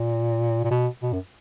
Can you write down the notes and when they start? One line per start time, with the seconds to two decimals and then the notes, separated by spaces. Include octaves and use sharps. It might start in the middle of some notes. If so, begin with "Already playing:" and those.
Already playing: A#2
0.64 A#2
0.71 B2
1.03 B2
1.13 F#2